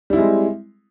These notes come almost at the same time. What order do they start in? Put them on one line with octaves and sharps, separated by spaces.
G3 E4 C4 G#3